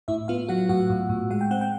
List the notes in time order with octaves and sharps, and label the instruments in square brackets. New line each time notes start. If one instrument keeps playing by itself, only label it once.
[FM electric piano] A2 E4 E5
B3 F4 F5
F#3 F#4 F#5
A2 F#4 F#5
A2
A2
G#3 F#5
G5
C4 F#5
G5